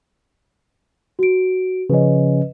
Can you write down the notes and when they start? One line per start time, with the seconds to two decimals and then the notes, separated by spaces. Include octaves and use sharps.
1.19 F#4 D7
1.90 C#3 F3 C#4 B4 D#5